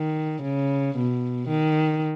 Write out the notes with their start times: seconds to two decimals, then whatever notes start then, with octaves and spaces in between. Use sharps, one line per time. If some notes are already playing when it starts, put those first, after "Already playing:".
Already playing: D#3
0.43 C#3
0.96 B2
1.48 D#3